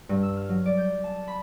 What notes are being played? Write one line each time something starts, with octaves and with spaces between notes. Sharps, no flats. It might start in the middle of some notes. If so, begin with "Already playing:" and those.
G2
E6
F6
F#3
D5
G6
A5
B5